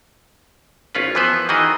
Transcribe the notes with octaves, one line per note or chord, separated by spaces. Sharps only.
G#1 C#4 F4 B4
E3 F3 B3 B4 C5
D#3 E3 F#4 G#4 D#5